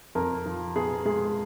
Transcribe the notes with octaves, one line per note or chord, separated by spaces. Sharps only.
F2 A#4
F3
B3 G#4
G#3 G#4